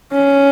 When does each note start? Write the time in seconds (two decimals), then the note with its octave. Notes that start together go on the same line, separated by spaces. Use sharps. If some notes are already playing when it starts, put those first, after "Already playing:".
0.12 C#4